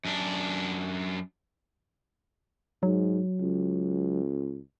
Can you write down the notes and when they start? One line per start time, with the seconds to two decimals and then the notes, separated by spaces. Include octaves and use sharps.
0.05 F#2 D4
2.83 G#2 F#3
3.40 C#2